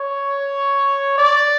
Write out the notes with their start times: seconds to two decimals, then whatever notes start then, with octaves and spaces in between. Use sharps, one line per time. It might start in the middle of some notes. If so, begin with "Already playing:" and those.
Already playing: C#5
1.18 D5